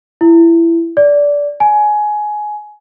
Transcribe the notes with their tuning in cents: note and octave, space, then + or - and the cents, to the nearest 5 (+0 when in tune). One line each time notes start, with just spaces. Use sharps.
E4 +20
D5 -15
G#5 +20